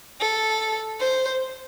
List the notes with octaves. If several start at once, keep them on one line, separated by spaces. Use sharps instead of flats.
A4
C5